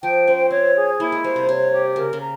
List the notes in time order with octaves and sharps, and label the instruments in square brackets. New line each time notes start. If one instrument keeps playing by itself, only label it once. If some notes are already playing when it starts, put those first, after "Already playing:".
[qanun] F3 [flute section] G5
[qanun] C#4 [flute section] C5
[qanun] C4 [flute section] C#5
[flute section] G#4
[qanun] A#3 [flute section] E4
[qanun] G#3
[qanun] G3 [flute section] C5
[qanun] C3
[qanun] C3 [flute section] C#5
[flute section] G4
[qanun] C#3 [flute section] A#4
[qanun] C#3
[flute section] A#5